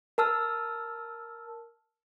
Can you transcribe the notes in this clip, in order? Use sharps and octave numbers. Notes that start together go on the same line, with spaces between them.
A#4 A5 E6 F6